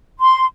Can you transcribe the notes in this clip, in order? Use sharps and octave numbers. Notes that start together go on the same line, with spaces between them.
C6